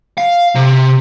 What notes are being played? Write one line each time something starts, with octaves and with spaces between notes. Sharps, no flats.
F5
C3